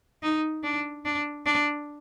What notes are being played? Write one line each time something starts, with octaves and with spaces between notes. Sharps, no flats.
D#4
D4
D4
D4